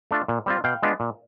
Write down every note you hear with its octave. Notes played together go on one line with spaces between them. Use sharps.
A3 D4 F4
A#2
G3 C4 F4
B2 F5 G5
G#3 B3 D4 F4
A#2